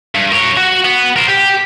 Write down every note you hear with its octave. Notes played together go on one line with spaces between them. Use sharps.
G2
A#4 C#5
F#4
B3
A#4 C5
G4